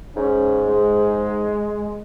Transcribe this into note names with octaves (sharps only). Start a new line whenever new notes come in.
G#2 C#4
G#3